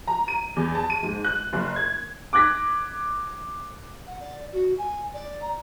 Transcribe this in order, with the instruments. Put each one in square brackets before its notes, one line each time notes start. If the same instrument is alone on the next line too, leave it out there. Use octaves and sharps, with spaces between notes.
[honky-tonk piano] A#5
D#7
E2
A5
D#7
G#2
F#6
F#1
G#6
[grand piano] D6 F#6 G#6 A#6 B6
[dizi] F#5
D5
F#4
G#5
D5
A#5